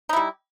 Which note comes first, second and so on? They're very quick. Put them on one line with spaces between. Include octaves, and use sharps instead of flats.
D#4 E4 G3